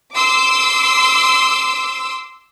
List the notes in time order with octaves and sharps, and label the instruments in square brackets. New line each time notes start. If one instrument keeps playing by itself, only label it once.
[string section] C6 D6 E6